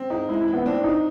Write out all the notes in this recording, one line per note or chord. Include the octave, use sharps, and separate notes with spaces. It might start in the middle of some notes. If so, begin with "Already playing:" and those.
Already playing: C4
G#2 D#4
G#3 E4
E4
E3
B3
C4 D4
G#2 D#4